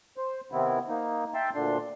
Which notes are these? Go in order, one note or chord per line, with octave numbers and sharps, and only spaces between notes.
C5
C3 D#3 B3 C4 E4
A#3 D#4
E5 G5 A5 C6
D2 A#2 D3 D4 C6